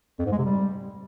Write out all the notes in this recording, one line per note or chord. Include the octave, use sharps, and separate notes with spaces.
F2
G#2
G#3
C3
G3